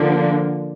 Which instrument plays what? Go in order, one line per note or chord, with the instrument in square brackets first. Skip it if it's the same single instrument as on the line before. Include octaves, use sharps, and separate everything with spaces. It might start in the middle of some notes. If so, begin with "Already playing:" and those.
Already playing: [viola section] D3 F3 A#3